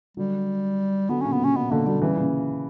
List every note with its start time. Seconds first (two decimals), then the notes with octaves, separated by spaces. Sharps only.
0.17 D3 F#3 G3
1.09 D3 F#3 B3
1.21 A#2 C#3 C#4
1.32 B3
1.40 A#2 C#3 C#4
1.56 B2 B3
1.71 B2 D3 A#3
1.86 D3 F#3 G3
2.01 C#3 E3 G3
2.17 A#2 C#3